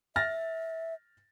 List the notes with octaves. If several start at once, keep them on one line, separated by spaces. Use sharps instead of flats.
E5 F6 A6 A#6